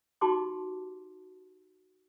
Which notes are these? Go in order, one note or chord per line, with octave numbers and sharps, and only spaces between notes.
D#4 F#4 G4 A5 C6 D6